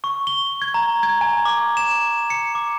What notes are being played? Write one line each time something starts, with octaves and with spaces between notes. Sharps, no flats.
C#6
G7
G#6
A#5
G#6
G#5
D6
E7
C#7
D6